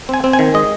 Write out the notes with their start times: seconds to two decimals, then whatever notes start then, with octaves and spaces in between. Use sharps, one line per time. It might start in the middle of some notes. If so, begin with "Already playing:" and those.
0.09 C4 G#5
0.24 C4
0.33 G#5
0.39 D#3
0.54 G#3 D#5